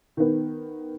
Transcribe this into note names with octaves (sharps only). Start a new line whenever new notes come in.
D#3 B3